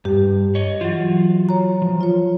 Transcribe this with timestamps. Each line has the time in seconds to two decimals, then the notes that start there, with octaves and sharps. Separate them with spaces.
0.05 G2 G4
0.55 C#5 D#5
0.81 E3 F#3 F4 F#4
1.49 C#5 A#5
1.82 F3
2.01 F4 C#5